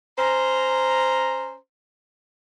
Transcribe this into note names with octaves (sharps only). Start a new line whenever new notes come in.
C#4 C5 A#5